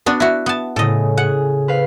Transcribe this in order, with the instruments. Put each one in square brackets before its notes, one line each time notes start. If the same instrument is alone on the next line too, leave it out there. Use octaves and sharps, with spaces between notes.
[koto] B3 D4 F#4
E4 F#4
B3 A5
[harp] A2 C#3 [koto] A4 D#5
[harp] G#4 [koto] F#5
[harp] B4 F5 B6